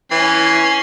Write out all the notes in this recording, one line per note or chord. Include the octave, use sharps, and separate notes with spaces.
E3 C#4 C7